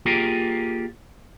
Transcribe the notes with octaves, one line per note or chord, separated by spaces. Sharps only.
A#3 F4 G4 G#4 A#4